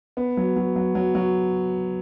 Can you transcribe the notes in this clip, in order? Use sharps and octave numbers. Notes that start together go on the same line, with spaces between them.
B3
F#3
F#3
F#3
F#3
F#3